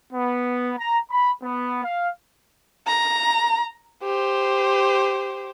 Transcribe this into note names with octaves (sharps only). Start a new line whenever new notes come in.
B3
A#5
B5
B3
F5
A#5
G4 C5